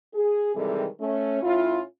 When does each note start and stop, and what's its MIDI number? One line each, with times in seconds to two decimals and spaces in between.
0.14 0.53 68
0.55 0.86 48
0.55 0.86 51
0.55 0.86 52
0.55 0.86 55
0.55 0.86 56
0.55 0.86 69
1.00 1.39 57
1.00 1.39 61
1.42 1.81 45
1.42 1.81 61
1.42 1.81 64
1.42 1.81 65